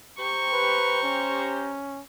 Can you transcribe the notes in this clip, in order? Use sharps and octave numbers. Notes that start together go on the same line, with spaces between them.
G4 C5 A#5 C#6
B4
C#4